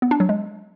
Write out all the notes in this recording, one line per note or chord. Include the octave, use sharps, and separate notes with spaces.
B3
D4
F#3
G#3